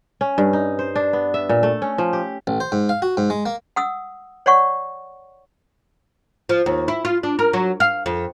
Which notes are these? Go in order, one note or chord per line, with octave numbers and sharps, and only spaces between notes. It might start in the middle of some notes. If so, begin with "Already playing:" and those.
C#4
G2
D#4
C5
D4
B3
E5
A#2
A3
C#4
F3
G4
A1
C5
G#2
F5
F#4
G#2
G#3
A#3
F#5 D#6 E6
C#5 D5 F#5 C#6
F3
D#2
E4
F4
D4
A#4
F#3
F5
F2